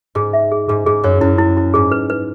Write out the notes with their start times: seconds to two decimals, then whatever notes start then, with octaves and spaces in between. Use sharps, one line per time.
0.15 G#2 G#4
0.33 E5
0.51 G#4
0.68 G#2 G#4
0.86 G#2 G#4
1.03 F#2 C#5
1.21 F#2 E4
1.38 E4
1.57 E4
1.74 G#2 G#4
1.92 B4
2.10 B4